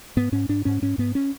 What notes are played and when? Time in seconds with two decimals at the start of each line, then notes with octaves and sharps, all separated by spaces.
0.17 G#2 B3
0.32 G#2 C#4
0.49 G#2 D4
0.65 G#2 C#4
0.82 G#2 C#4
0.98 G#2 B3
1.15 C#4